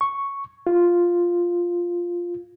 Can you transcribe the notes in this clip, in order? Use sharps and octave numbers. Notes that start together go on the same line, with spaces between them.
C#6
F4